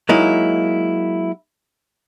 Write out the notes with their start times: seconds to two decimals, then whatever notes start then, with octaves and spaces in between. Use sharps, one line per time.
0.09 F#3 G#3 A#3 D#4 E4